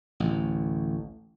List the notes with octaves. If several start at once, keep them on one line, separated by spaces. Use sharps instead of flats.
A1 D2